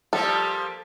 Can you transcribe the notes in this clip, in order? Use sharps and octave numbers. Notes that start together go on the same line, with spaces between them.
F3 G3 A#3 A4